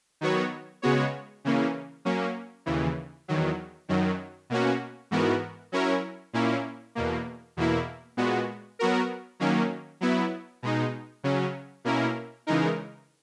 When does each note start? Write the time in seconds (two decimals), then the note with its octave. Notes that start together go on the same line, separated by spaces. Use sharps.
0.21 D#3 F#3 B3 F#4 C#5
0.82 C#3 G#3 B3 F#4 C#5
1.45 C#3 E3 A#3 C#4
2.05 F#3 A#3 C#4
2.66 D#2 C#3 E3
3.28 E2 D#3 F#3
3.89 F#2 D#3 F#3
4.50 B2 A#3 C#4 F#4
5.11 G#2 E3 B3 F#4 A#4
5.72 F#3 C#4 E4 A#4 C#5
6.33 A#2 A#3 C#4 E4
6.95 E2 B2 A#3
7.57 E2 B2 A#3 E4
8.17 A#2 G#3 B3 F#4
8.79 F#3 B3 F#4 A#4
9.40 D#3 F#3 A#3 C#4
10.01 F#3 B3 E4
10.63 B2 G#3 D#4
11.24 C#3 F#3 C#4
11.84 B2 A#3 C#4 E4 A#4
12.47 C#3 E3 G#3 D#4 A#4